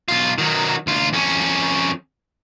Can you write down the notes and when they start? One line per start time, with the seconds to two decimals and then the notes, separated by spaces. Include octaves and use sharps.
0.08 B1 F4
0.38 D#3 F#3
0.87 D2 F4
1.13 F2 C#4